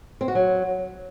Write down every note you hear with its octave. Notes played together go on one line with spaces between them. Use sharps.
C4
F#4
F#3